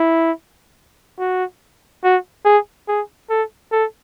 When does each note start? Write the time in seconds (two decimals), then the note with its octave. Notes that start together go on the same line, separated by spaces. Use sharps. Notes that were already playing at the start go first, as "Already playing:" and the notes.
Already playing: E4
1.19 F#4
2.04 F#4
2.45 G#4
2.88 G#4
3.30 A4
3.72 A4